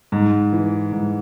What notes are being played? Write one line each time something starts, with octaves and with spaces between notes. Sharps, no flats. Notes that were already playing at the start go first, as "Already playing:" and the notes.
G#2
E3
G#2